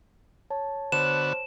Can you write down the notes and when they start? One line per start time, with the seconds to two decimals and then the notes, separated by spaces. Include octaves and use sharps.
0.50 C#5 A5
0.92 D3 B3 F#4 C5 E7